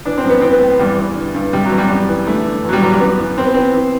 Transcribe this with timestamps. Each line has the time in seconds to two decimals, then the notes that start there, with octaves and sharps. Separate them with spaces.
0.05 E3 D4
0.18 C4
0.24 F#2
0.30 B3
0.41 E3 C4
0.51 B3
0.61 A2
0.79 E2 G3
0.98 E3
1.16 D3
1.34 G2
1.53 C3 G3
1.65 F#3
1.71 E2
1.78 G3
1.89 F#2 G3
2.08 E3
2.27 D3 A3
2.46 D3
2.64 E2 F#3
2.73 G3
2.82 E2 F#3
2.92 G3
3.00 F#2 B3
3.20 E3
3.38 E3 C4
3.45 B3
3.54 E3 C4
3.74 E3